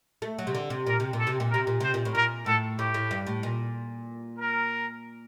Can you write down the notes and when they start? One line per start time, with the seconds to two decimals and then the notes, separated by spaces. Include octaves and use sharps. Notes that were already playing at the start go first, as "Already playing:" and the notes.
0.22 A3
0.38 F#3
0.47 C3
0.55 D3
0.70 C3
0.86 A#2 A#4
1.00 C3
1.13 A#2
1.19 A4
1.27 C3
1.40 A#2
1.51 C3 A#4
1.67 A#2
1.80 C3 C5
1.94 A#2
2.05 A2
2.14 A#2 A#4
2.46 A2 A4
2.78 A2 G4
2.94 A2
3.11 G2
3.27 A2
3.43 A#2
4.38 A#4